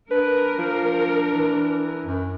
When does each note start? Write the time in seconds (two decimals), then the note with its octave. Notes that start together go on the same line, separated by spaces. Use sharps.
0.11 D4 A#4 B4
0.58 F3
1.34 E3
2.06 F#2